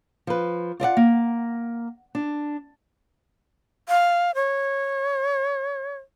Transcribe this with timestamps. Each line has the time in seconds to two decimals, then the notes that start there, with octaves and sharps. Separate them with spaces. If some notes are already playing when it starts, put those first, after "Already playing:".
0.27 F3 B4
0.80 F4 D5 D#5 F#5
0.97 A#3
2.15 D4
3.88 F5
4.35 C#5